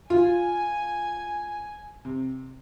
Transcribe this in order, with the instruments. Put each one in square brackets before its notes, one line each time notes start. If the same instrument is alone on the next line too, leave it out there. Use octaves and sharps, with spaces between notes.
[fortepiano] F4 [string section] G#5
[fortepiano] C3